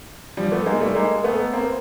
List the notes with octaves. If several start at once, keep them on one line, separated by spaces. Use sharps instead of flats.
F3 G3
A3 B3
G#3 A#3
G3 A3
G#3 A#3
A3 B3
A#3 C4